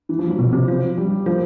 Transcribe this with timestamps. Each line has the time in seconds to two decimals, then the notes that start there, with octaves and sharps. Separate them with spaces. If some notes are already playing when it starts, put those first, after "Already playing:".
0.09 E3
0.19 F3
0.29 F#3
0.39 B2
0.53 C3
0.68 F3
0.98 G3
1.26 F3 A#3